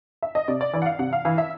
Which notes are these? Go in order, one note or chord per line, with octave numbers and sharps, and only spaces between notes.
E5
D#5
C3 D5
D5
E3 D5
F#5
F5
C3 F#5
F5
E3 F5
E5